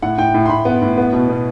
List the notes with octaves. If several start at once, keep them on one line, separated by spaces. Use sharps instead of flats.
A2 F#5
A2 G5
A2
C6
A2 B5
B3
A2
B3
B2
B2